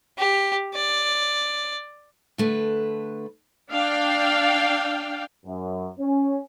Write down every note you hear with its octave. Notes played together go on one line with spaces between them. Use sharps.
G4
D5
D3 A3 B4
D4 F5 G5
F#2
C#4